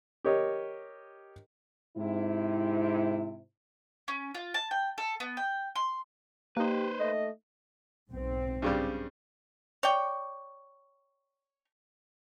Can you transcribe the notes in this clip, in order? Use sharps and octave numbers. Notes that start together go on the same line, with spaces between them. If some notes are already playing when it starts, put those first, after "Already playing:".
G4 A#4 C#5 D#5
G#2 C3 E4
C#4
F4
A5
G5
A4
B3
G5
C6
A#3 D#4 G4 B4 C5
A3 D#5
B1 G#2 C4
G2 C#3 G3
C#5 D5 G5